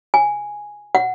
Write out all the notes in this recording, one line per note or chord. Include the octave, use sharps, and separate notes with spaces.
G#5
F#5